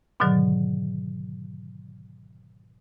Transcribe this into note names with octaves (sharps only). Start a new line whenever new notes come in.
G#2 B2 D3 D#3 F#3